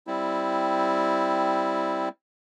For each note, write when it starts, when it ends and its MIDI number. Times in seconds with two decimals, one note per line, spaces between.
0.07 2.09 55
0.07 2.09 60
0.07 2.09 64